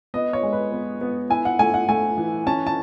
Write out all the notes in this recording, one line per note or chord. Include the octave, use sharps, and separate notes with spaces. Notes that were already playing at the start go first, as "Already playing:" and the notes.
B3 D#5
C#5
G#3
B4
B3
B3
E4 G#5
F#5
A3 G#5
F#5
A3 G#5
E3
C#4 A5
A5